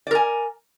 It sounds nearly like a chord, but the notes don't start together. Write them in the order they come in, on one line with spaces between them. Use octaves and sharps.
D5 A#4 G#5